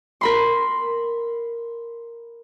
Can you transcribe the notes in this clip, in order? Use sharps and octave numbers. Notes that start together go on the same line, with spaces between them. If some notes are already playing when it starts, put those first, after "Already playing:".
A#4 B5 C6